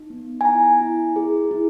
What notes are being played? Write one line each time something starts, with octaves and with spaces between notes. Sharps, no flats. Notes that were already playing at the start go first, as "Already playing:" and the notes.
Already playing: D#4
B3
G#5
E4 A#5
E4
G#4
E4